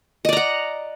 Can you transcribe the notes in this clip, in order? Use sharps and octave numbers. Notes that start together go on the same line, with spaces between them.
D5 D#5 F#5 A#5